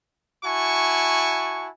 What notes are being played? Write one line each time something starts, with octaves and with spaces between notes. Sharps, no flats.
E4 F#4 G#5 A5 C#6